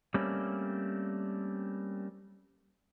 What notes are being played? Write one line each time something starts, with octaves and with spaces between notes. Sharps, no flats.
G3 A3 A#3 C4 C#4